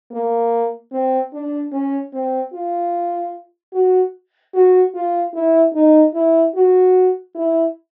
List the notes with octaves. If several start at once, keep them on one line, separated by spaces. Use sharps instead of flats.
A#3
C4
D4
C#4
C4
F4
F#4
F#4
F4
E4
D#4
E4
F#4
E4